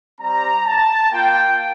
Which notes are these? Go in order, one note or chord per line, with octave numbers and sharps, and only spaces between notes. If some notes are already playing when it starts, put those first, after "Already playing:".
G3 C4 G4 A#5
A5
A#3 F4 G5